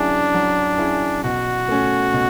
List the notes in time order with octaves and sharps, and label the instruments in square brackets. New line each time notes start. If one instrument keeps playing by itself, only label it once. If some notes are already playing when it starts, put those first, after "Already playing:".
Already playing: [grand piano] F#3 C#4 E4 G#4 [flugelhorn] D4
[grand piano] F#3
C#4 E4 G#4
[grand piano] B2 [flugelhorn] F#4
[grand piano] A3 C#4
B2